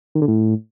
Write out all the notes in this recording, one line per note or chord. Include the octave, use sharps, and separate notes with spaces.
D#3
D3
A2